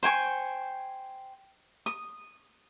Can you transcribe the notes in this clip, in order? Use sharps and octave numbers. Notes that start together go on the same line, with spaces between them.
C5 G5 G#5 C#6
D#6